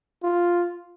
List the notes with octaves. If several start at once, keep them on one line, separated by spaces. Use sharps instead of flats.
F4